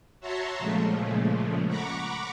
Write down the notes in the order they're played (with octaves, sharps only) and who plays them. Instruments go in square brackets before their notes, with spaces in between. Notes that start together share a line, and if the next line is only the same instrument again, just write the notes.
[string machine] F#4 C#5 E5 A5 A#5 C6
A#2 C#3 F3 G#3 A3
F#5 A#5 B5 C#6 D6